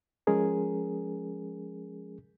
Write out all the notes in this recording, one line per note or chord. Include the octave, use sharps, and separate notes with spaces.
F3 G#3 C#4 G#4 A#4